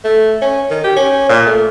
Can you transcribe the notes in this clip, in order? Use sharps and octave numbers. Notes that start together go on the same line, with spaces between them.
A3
C#4
D#3
G4
C#4
A#2
A3